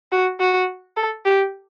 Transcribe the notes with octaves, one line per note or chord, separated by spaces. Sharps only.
F#4
F#4
A4
G4